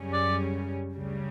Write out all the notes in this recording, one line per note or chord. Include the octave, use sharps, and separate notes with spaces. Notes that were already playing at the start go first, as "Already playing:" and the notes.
Already playing: F#2 C#3 G3 C#4
D5
D2 C#3 G3